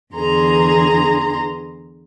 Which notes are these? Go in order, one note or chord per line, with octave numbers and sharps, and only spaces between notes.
E2 D3 E3 G#4 A#5 C6